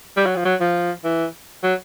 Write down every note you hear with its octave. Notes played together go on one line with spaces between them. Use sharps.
G3
F#3
F3
F#3
F3
E3
F#3